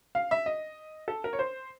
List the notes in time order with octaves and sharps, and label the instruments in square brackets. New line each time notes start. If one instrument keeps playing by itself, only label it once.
[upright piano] F5
E5
D#5
A4
A#4
C#5
C5